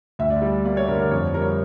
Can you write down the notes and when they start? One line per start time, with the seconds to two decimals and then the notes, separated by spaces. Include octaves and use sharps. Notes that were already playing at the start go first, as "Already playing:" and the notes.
0.19 D2 E5
0.30 D5
0.42 G3
0.65 A#3 D5
0.77 C#5
0.88 D3 A#4
1.00 A#4
1.11 F2 C#5
1.34 G3 A#4
1.42 C#5
1.49 A#4